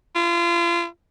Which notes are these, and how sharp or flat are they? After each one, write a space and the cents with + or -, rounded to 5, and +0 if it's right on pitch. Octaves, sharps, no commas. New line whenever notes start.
F4 -35